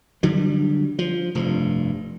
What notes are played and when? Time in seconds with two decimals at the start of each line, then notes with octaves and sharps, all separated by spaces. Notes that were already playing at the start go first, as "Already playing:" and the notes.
0.23 D3 F#3 G3
0.99 F3
1.35 F1 G2